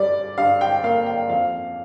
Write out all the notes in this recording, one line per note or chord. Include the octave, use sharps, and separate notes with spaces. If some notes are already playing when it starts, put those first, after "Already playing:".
Already playing: G2 G3 D5
G2 F5
G5
A#3 F5
G5
F2 F5